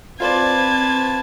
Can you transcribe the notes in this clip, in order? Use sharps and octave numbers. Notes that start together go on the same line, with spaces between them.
C4 F4 B4 C5 D5 A5 G#6